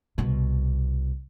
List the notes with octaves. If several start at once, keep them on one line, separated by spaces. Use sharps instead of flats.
C2 B2